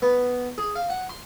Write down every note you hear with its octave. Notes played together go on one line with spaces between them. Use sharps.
B3
G#4
F5
F#5
C6